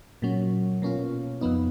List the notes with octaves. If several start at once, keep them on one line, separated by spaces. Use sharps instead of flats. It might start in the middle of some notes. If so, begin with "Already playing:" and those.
A#2 F#3 C#4
B2 A#3 C#4 F4
F2 F3 B3 D#4